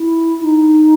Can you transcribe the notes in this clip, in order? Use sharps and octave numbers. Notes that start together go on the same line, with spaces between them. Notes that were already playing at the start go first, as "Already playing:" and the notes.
Already playing: E4
D#4